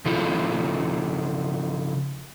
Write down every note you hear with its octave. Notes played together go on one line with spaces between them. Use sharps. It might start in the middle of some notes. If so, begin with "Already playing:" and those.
C#3 F3 E4 F4 A4